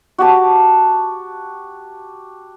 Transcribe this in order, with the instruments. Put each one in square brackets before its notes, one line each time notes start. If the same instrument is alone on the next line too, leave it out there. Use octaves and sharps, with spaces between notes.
[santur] F#4 G4 A5